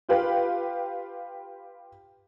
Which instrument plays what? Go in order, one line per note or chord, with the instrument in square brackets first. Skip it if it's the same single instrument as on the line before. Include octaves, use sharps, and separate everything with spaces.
[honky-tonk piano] F4 G4 B4 F5 G5